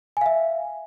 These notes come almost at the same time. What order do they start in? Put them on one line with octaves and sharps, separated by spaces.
G#5 F5 E5